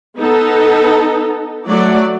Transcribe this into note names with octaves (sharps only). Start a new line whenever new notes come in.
B3 D#4 A4
F#3 A3 D5